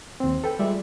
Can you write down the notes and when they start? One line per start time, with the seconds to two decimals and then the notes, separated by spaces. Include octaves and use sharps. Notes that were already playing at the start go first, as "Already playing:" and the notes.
0.20 D#2 C4
0.44 A4 B4 G5
0.59 G3 G#3 F4 D5 E5